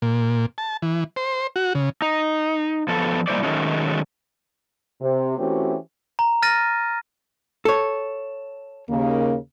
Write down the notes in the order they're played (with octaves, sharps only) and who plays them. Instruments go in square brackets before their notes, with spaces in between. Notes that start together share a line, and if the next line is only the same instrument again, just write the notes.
[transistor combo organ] A#2
A5
E3
C5
F#4
C#3
[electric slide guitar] D#4
F3 B3 A4
G3 A#3 E4 C5 D5
D#3 F3 F#3 G#3 A3 C#4
[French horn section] C3
E3 A3 C4 C#4 F#4 G4
[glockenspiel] A#5
F6 A6 A#6 D#7
[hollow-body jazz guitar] A4 C#5
[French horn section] D#2 C#3 A#3